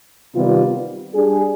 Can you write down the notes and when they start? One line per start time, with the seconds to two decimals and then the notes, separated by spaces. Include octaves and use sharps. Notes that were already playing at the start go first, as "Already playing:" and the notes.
0.35 C3 D#3 G3 B3 F4
1.14 G3 D4 G#4